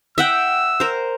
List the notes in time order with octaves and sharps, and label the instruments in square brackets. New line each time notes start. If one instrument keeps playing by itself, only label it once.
[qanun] E5 F#5 G5 [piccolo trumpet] E6
[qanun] A#4 C5